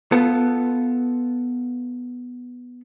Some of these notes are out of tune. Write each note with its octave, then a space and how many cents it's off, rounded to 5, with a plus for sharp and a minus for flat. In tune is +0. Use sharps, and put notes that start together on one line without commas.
B3 +0 F4 +0 A4 +0